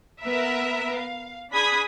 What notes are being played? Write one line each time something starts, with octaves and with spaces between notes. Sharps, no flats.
B3 A#4 B4 E5
F5
D4 G#4 B5 D#6 G#6 B6